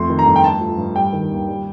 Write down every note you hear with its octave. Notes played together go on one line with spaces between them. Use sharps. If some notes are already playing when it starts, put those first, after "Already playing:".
Already playing: F2 A3 C6
D#3
A#5
G2
G5
A3 A5
F3
G2
G3 G5
D#3
D#2
G3